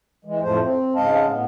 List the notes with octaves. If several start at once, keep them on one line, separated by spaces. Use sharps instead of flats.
E3 G#3
F2 A2 F3 A3 C5
C4
G#2 C#3 G#3 D#5 F5 A5
A2 B3